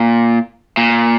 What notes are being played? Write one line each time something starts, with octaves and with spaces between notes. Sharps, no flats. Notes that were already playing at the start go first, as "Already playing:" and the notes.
Already playing: A#2
A#2